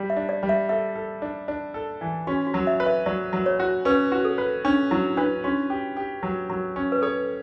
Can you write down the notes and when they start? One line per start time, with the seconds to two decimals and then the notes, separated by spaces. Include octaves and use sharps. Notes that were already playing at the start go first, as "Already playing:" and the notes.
Already playing: G3
0.10 E5
0.16 D4
0.29 D5
0.43 G3
0.49 E5
0.69 A4 E5
0.96 A4
1.22 D4
1.48 D4
1.74 A4
2.01 E3
2.27 C#4 F#4
2.47 F#4
2.54 F#3
2.67 E5
2.80 B4
2.86 E5
3.06 F#3 D5
3.33 F#3
3.46 C#5
3.60 F#4
3.85 C#4 B4
4.12 F#4
4.25 A4
4.38 B4
4.65 C#4 D4
4.91 F#3 E4
5.17 D4 B4
5.44 C#4 F#4
5.70 G4
5.97 G4
6.23 F#3
6.50 F#3
6.76 C#4
6.92 B4
7.02 A4 C#5